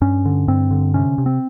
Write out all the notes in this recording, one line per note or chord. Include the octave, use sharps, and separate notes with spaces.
G2 C#4
D3
G2 C4
D3
C3 C#4
C3
C4